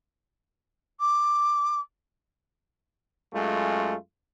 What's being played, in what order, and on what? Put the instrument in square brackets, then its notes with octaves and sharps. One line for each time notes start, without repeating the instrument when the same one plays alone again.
[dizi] D6
[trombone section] F#2 G#3 A3 F4